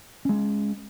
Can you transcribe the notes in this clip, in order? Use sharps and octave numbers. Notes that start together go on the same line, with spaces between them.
G#3 C#4